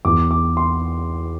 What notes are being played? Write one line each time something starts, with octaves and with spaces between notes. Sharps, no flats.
E2 E3 D6
D6
C6